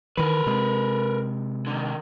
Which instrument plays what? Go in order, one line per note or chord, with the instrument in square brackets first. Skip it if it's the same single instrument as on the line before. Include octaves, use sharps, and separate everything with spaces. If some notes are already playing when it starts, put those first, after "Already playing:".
[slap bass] D#3 E3 [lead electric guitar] A#4 B4
[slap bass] C3 G#3
[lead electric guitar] D3 D#3